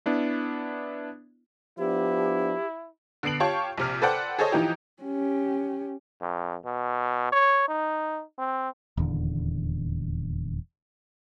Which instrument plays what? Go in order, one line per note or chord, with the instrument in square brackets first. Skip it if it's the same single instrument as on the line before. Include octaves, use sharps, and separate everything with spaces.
[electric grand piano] B3 D4 E4
[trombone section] F3 B3 D4 [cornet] E4 [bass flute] G4
[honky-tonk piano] D3 B3 C7 D7 F#7
F4 G4 C#5 A5 C#6
A#1 C3 F6
A4 B4 C5 D5 F#5 G5
G#4 A4 C5 C#5 D#5
E3 F3 D#4 G4
[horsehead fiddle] C#4 G4
[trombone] F2
B2
C#5
D#4
C4
[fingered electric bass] D#1 E2 D3